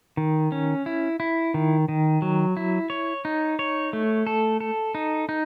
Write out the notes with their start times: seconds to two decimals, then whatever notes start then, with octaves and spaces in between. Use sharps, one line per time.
0.17 D#3
0.52 C#4
0.86 E4
1.20 E4
1.54 D#3
1.88 D#3
2.22 F#3
2.57 E4
2.90 C#5
3.25 D#4
3.59 C#5
3.93 A3
4.27 A4
4.60 A4
4.95 D#4
5.29 D#4